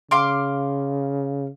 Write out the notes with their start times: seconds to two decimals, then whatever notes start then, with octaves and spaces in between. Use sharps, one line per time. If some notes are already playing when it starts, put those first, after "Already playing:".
0.11 C#3 F5 C6 D6